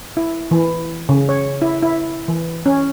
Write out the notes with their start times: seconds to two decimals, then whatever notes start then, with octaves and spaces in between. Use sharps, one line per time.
0.17 E4
0.51 E3
1.09 C#3
1.29 C#5
1.62 E4
1.82 E4
2.28 E3
2.66 C#4